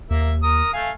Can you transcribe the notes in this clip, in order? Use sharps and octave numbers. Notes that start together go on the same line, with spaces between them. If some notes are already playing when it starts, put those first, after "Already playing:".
D#2 A#3 E5
A#4 D#6
A3 F5 G#5